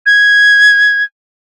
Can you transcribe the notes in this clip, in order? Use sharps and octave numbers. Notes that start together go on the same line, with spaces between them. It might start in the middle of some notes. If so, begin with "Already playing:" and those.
G#6